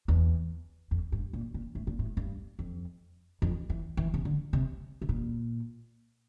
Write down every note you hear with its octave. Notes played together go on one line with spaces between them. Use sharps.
E2
F2
G2
A#2
A#2
A2
A#2
A2
G2
F2
F2
E3
E3
C3
D3
C3
C3
A#2